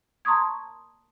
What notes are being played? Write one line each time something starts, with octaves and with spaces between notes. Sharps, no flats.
A5 A#5 C6 C#6 D#6 G#6